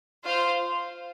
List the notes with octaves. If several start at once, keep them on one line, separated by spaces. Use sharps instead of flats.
F4 C5 F5